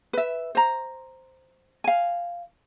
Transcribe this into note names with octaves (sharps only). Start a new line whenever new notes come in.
B4 E5
C5 A#5
F5 G#5